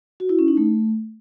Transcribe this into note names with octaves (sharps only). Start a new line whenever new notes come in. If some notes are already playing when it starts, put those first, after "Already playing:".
F#4
E4
C#4
D#4
A3